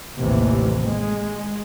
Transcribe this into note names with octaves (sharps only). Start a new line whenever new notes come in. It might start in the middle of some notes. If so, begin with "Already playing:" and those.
A1 D#2 C3 E3
G#3